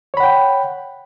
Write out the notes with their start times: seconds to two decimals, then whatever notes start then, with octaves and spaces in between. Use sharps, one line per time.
0.14 C#5
0.17 B5
0.20 F#5
0.23 G5